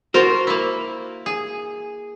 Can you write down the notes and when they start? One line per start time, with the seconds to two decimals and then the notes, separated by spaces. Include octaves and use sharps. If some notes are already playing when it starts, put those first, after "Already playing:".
0.14 F4 F#4 A#4 C5
0.47 A#3 E4
1.26 G#4